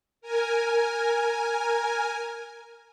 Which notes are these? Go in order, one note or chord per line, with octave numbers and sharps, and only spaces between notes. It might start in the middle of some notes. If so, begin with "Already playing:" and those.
A#4 G#5